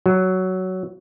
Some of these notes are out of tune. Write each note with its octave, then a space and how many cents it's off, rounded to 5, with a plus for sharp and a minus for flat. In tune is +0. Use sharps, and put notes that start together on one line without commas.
F#3 +10